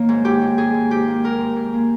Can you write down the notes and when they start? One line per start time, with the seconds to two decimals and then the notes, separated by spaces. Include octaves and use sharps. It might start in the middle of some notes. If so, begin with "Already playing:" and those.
Already playing: D#3 A#3 C#5
0.09 G#2
0.25 G#2 G4
0.41 G#2
0.58 G#2 G#4
0.74 G#2
0.90 G#2 G4
1.08 A#3
1.24 G#2 A#4
1.41 G#2
1.56 G#2
1.73 A#3